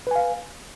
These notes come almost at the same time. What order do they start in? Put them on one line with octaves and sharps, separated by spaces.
B4 G#5 F5